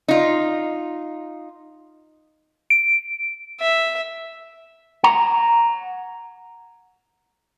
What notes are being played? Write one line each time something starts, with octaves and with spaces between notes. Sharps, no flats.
D#4 F4
D7
E5
F#5 A#5